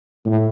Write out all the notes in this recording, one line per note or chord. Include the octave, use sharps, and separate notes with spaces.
A2